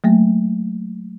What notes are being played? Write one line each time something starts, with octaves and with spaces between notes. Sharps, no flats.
F#3 A3 A#3